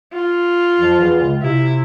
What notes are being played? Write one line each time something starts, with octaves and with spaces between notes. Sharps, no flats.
F4
F2 F3
E2 E3
C#2 C#3
C3 E4